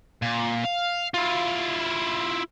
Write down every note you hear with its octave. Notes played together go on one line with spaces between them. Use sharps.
A#2
F5
E4 F4